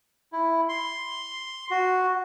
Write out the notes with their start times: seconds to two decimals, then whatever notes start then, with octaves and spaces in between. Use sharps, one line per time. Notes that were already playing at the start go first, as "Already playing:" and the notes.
0.32 E4
0.69 C6
1.71 F#4